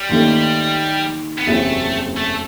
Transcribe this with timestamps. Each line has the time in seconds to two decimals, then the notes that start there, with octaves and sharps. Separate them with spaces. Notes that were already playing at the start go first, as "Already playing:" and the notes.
Already playing: G3
0.09 D#2 D#3 A3
1.39 B3
1.47 F#1 E2 C3 F#3 A3 C4
2.17 A3